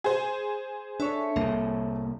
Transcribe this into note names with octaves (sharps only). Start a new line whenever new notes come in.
G#4 C5
D4 A4 C#5 E5
C2 A2 A#3